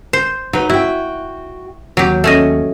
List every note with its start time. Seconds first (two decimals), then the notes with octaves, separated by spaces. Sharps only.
0.13 C5
0.53 F#3 D#4 B4
0.70 E4 F#4 G5
1.97 D#2 F#3 G4
2.24 A3 C#4 D#5